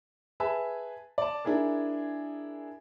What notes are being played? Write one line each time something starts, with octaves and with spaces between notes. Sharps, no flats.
G#4 B4 E5 G#5 A5
D5 A5
D4 E4 G#4 A#4